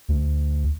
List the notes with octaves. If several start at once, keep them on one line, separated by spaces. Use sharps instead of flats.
D2